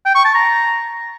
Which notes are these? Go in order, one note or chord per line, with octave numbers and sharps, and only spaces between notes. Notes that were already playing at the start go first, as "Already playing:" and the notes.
G5
C#6
A5
A#5